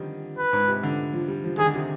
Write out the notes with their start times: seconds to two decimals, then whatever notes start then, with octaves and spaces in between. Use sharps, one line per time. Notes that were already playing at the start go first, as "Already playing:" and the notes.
Already playing: D3 D#3 F3 G3
0.38 B4
0.53 G#2
0.68 C3
0.83 D3
1.13 F3
1.28 G3
1.44 F3
1.58 D#3 G#4
1.66 D3
1.74 C3